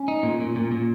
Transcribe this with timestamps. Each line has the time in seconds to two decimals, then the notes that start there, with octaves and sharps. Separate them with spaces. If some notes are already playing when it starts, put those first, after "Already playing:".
Already playing: C#4
0.08 D#4
0.23 A#2
0.40 A#2
0.56 A#2
0.72 A#2